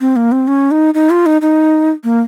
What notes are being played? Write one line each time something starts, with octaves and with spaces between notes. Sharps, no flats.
C4
A#3
C4
C#4
D#4
D#4
F4
D#4
D#4
A#3